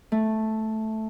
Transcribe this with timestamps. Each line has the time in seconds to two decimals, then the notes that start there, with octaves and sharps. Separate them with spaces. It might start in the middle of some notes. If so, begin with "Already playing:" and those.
0.12 A3